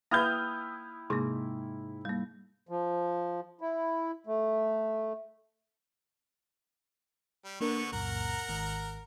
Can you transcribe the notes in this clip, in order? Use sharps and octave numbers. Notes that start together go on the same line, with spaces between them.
A#3 E4 B4 F5 G5 D#6 F6 G6
G#2 C3 A#3
G3 A#3
F3
E4
A3
G3
D3 A#3 B3 D4 A#4 C#6
C#2 F#2 A#2 A#4 F#5 A#5
G#1 G#2 D#3